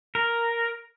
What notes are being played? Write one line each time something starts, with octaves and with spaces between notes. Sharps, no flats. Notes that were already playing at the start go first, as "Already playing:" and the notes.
A#4